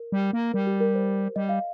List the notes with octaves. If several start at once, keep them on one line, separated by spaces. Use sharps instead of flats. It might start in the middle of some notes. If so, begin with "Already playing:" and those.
Already playing: A#4
G3
A#3
G3 A#4
G4
A#4
C5
G3 D#5
F5